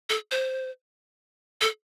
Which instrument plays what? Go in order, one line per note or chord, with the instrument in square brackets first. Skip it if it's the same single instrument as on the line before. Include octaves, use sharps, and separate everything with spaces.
[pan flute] A4
C5
A4